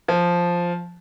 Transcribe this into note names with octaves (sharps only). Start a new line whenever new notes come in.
F3